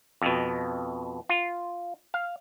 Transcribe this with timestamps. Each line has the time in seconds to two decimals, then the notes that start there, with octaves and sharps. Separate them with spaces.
0.22 F2 B2
1.29 F4
2.14 F5